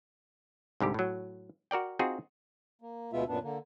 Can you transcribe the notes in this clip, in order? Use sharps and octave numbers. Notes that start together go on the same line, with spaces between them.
C2 G#2 D3 G4
A2 F#3
F#4 A#4 D5 G5
C4 D#4 F4 F#4 G#4 C5
A#3
D2 B2 G#3 B3 F4 E5
F#2 A#2 B3 D4
D3 A#3